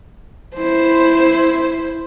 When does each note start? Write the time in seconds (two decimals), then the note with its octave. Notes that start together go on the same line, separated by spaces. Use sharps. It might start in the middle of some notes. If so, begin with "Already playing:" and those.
0.56 E4 C5